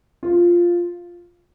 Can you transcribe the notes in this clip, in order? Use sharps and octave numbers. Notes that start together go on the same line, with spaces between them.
F4